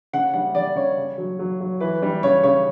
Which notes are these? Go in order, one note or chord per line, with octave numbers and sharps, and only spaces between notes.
C#3 F#5
G3 F#5
G3 D5
C#3 C#5
C#3
F#3
F#3
F#3
E3 B4
G3
C#3 C#5
C#3 C#5